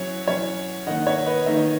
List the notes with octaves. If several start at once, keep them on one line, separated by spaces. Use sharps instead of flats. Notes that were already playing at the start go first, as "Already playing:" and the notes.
Already playing: F#3 C#4 E4 C#5 E5
F#3 C#4 E4 C#5 E5
D#3 A#3 D#4 D#5 F#5
C#5 E5
B4 D#5
D#3 A#3 D#4 E5
D#5